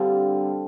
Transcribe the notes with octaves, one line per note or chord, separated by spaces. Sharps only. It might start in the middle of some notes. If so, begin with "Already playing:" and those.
Already playing: D3 G3 C4 F4